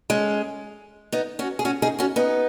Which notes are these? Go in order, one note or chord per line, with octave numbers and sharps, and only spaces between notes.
G#3 C#4
B3 D#4
C#4 F#4
G#4
C#4 F#4
D#4 G#4
C#4 F#4
B3 D#4